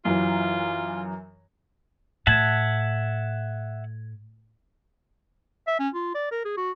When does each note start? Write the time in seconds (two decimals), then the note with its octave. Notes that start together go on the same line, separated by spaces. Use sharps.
0.05 F#2 E3 F#3 F4
2.27 A2 E5 F#5 A5 G#6 F#7
5.67 E5
5.80 C#4
5.94 F4
6.15 D5
6.32 A#4
6.45 G#4
6.57 F#4